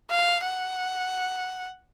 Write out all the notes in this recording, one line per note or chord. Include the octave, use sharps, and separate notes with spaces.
F5
F#5